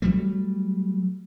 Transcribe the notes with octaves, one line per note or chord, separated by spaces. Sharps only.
F#3 G3 A3